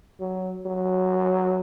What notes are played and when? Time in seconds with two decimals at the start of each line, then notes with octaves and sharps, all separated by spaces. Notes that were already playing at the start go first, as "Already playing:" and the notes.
0.20 F#3
0.66 F#3